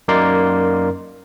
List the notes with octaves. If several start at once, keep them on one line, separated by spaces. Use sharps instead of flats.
F#2 A#3 D#4 A#4 D5 C6